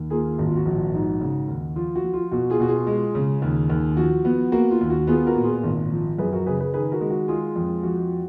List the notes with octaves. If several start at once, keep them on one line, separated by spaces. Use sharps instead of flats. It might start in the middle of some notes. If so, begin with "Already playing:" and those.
Already playing: D#2
A#3 F4 G#4
G#1 F#4
F4
F#4
A#1
G#2
C#3
D#2
F3 F4
F#4
F3
F4
B2 F#4
F4 G#4
B2 F#4
F4 G#4
G#3
C#3
D#2
D#2
F3 F#4
B3
A#3 F#4
F4
D#2
F#4
B3 F4 G#4
F#4 A#4
A#2
F4 G#4
G#1
F3
F#2 G#4 B4
F#4 A#4
C#3 G#4 B4
G#4 B4
D#3 G#4 B4
F#4 A#4
G#3
F#4
G#3 F4 G#4
F2
F3 F#4